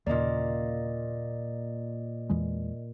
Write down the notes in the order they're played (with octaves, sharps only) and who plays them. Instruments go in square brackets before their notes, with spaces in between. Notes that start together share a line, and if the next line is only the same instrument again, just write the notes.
[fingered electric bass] D#2 C#3 [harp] A#2 A#3 [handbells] D5 D#5
[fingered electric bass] E2 E3 G#3